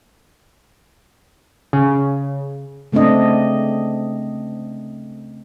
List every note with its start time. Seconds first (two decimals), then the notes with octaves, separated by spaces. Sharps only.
1.73 C#3
2.92 C#3 A3 C4 D4 D#5